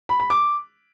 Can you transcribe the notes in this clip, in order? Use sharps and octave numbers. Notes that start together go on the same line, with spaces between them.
B5
B5
D6